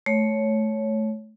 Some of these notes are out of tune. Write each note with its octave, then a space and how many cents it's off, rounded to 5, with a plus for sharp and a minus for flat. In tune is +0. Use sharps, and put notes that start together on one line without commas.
A3 -20 C#5 +0